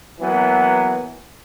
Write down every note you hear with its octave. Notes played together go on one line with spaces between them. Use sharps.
E3 F#3 A#3 B3